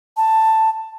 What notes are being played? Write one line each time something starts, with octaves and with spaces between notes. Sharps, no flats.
A5